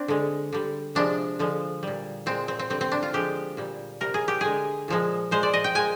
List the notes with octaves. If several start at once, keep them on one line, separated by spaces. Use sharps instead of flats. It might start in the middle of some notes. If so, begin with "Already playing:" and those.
Already playing: C4 D4
D3 G#3
D3 G3
C3 F3 G#3 D4
D3 F3 G#3
A#2 G3
A#2 G#3 C4
C4
C4
D3 G3 C4
C4
D4
F4
D3 F3 G#3 G4
A#2 G3
C3 G3 A#4
G#4
G4
D3 G#3 G#4
A#2 F3 G#3
A#2 G#3 C5
D5
D#5
G5
A#2 G#3 G#5